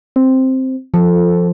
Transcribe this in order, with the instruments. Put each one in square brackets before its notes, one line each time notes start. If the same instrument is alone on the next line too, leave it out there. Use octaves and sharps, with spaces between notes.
[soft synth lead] C4
[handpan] F3 [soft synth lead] A4